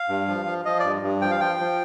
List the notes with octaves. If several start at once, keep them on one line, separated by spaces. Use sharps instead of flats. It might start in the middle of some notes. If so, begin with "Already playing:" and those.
Already playing: F5
G2
F3
F3
F3 D#5
G2 D5
G2
F3 G5
F5
F3 G5
F3